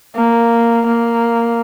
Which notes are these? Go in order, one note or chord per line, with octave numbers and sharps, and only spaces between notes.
A#3
A#3